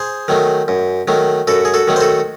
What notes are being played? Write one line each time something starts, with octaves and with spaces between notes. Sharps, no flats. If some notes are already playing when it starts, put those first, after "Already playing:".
Already playing: G#4 C5
D#3 F#3 A3
F#2
D#3 F#3 A3
F#2 F#4 A4
G#4
F#4 A4
D#3 F#3 A3
C5
F#4 A4